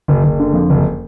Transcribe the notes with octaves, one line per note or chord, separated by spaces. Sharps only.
F#1
F#1
D3
F2
F#1